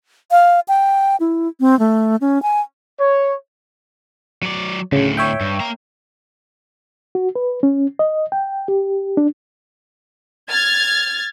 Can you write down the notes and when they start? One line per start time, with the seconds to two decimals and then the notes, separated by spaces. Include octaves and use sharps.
0.31 F5
0.68 G5
1.20 E4
1.60 C4
1.79 A3
2.21 C#4
2.42 G#5
2.98 C#5
4.43 F#3 D5
4.92 D2 A2 C#3
5.17 C#5 E5 G5
5.41 G2
5.60 A#3 A#5
7.15 F#4
7.35 B4
7.63 C#4
7.99 D#5
8.32 G5
8.68 G4
9.17 D4
10.49 F6 G#6 A6